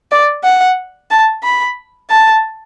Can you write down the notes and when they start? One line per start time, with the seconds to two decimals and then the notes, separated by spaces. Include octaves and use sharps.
0.11 D5
0.44 F#5
1.11 A5
1.43 B5
2.10 A5